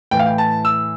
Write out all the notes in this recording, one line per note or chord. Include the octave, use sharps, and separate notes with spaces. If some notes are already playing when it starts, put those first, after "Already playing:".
A2 E3 G5
F5
G5
A5
E6